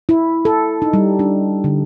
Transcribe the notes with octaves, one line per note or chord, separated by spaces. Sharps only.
E4
A4
D#4
G3
D4
D3